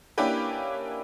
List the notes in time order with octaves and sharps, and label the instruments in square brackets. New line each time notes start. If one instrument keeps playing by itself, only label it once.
[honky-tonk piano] A#3 C#4 D4 E4 G4 B4